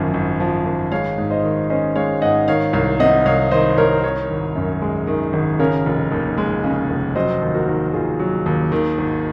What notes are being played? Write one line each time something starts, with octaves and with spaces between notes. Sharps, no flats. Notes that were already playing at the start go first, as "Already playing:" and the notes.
Already playing: G#1 F#2 F3
G#1
F3
G#1
G#3 C#5 F5
G#2
C5 D#5
D#3
C#4 C5 D#5
G#3 C#5 F5
G#2 D#5 F#5
D#3 C#5 F5
C2 C#5 F5
C3 D#5 F#5
C2 C#5 F5
D#3 C5 D#5
C2 A#4 C#5
D#3 A#4 C#5
G#1
F#2
G#3
D#3
G#1
C#3 A#4 C#5
F1
D#2
G#3
C#3
F1
F#3 C5 D#5
D#2
F#4 A#4
D#3
D#2 F4 G#4
F#3
D#2
D#3
G#1